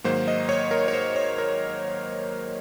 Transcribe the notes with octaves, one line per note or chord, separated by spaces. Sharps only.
G#2 D#3 F#3 A#3 C5
D#5
C#5
A#4
C#5
C5
C#5
A#4